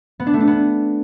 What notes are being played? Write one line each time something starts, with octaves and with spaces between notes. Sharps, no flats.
B3
D4
A3
D4
B3